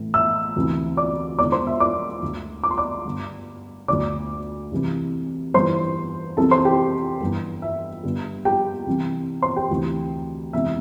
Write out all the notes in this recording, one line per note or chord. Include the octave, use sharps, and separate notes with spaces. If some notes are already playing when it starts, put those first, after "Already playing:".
Already playing: A1 A2 E3
E5 E6
D2 C3 E3
D5 D6
E1 E2 D3 D5 D6
C5 C6
E5
D5 D6
D2 D3
D6
C6
D5 D6
G1 G2 D3
D2 D3 D5 D6
C2 C3 E3
G1 G2 E3 C5 C6
C2 C3 E3 A4 A5
C5 C6
G4 G5
G1 G2 E3
E5
G1 G2 D3
G4 G5
C2 C3 E3
C5 C6
G4 G5
D2 C3 E3
E1 E2 C3 E3 E5